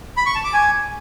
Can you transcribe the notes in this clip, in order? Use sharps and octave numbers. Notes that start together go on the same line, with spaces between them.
B5
C#6
A5
D6
G#5